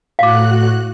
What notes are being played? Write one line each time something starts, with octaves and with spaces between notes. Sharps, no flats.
A2 F#4 F5 D6 F#6